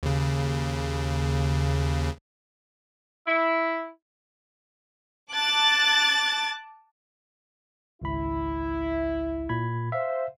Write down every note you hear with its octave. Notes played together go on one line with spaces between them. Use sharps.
D#2 C#3
E4
A5 D6 F#6 A6
G#1 C#2 E4 B5
A#2 B5 G#6
C5 E5 F5